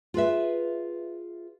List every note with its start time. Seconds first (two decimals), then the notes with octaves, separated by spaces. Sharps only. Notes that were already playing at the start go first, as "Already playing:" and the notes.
0.14 F4 G#4 B4 E5